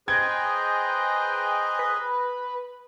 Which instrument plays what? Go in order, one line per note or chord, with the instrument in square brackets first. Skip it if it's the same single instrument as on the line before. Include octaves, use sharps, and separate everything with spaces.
[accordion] G#4 D#5 [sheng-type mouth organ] B4 C5 A#5 [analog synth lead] G5 [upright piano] G#6
[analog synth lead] B4